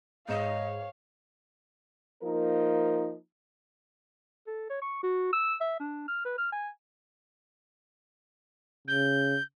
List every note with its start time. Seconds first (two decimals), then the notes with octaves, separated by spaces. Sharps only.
0.29 G#2 C#5 D#5 F5 E7
2.23 F3 A#3 D#4 A#4
4.47 A4
4.70 C#5
4.82 C#6
5.03 F#4
5.33 E6
5.61 E5
5.80 D4
6.08 F6
6.25 B4
6.38 F6
6.52 G#5
8.87 C#3 G6